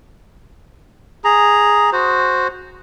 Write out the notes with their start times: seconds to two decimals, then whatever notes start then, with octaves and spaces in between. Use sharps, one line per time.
1.24 G#4 A#5
1.93 F#4 C5